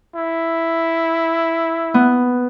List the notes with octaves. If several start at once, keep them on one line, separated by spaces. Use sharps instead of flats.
E4
B3